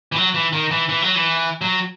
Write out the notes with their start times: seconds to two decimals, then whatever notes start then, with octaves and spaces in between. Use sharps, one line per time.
0.12 E3
0.16 F#3
0.34 E3
0.53 D#3
0.71 E3
0.89 E3
1.02 F#3
1.15 E3
1.61 F#3